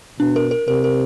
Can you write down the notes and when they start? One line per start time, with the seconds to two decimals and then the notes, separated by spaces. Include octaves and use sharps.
0.19 B2 D4
0.36 A#4
0.51 A#4
0.68 C3 A#4
0.84 A#4